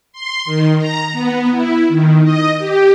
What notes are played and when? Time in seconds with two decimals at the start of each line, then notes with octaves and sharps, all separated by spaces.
0.12 C6
0.45 D#3
0.78 A#5
1.12 B3
1.51 E4
1.88 D#3
2.24 D#5
2.58 G4